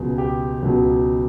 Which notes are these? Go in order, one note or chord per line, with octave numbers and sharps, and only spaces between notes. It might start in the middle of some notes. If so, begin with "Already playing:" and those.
Already playing: C#2 B2 F#3 G#4
G4
C#2 B2 F#3